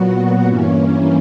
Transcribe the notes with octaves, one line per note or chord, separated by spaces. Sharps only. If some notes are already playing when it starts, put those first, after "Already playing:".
Already playing: A#2 F#3 B3 F#4
G2 E3 A#3 C#4